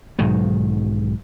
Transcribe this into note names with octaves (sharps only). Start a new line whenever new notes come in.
B1 G#2 D#3 F#3